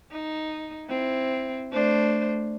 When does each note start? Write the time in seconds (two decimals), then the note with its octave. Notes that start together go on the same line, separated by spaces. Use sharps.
0.11 D#4
0.87 C4 E4
1.72 A3 D4 C5